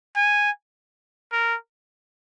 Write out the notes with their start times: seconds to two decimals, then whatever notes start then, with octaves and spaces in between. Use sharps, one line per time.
0.16 G#5
1.32 A#4